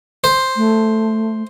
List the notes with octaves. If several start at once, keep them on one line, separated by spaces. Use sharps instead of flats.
C5
A3